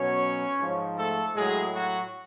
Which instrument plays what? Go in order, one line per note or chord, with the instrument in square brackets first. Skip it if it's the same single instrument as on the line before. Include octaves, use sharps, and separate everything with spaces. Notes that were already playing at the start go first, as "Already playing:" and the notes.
Already playing: [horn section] B2 F#3 C#4 C#5
G#2 F3
A3 A4
A2 F#3 G#3 G#4
F#3 F#4